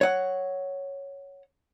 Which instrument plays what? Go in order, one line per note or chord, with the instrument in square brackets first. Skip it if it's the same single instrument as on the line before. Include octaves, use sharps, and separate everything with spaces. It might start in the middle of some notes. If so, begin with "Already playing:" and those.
[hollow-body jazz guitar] C#5 F#5